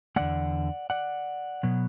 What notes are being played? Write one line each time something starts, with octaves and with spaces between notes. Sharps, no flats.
E2 D3 A3 D5 F#5
D5 F#5
B2 F#3 B3